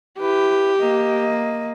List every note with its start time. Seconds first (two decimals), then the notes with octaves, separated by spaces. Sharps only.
0.19 E4 G4 B4
0.79 A#3 D#5